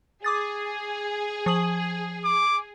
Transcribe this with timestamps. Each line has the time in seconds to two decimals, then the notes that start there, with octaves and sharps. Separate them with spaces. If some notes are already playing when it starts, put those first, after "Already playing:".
0.24 G#4 D6 D#6 A6
1.46 F3 D#6 F#7
2.25 D6